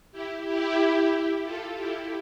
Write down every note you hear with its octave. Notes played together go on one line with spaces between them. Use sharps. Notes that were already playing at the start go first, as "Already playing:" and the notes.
E4 G4
E4 G4
F4 A4
E4 G4